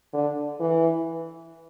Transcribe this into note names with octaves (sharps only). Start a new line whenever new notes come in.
D3
E3